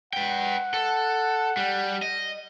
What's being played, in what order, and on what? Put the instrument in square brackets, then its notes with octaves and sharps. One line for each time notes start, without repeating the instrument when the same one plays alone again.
[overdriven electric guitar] B4 G5 [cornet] F#5
[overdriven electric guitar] A4
G3
D#5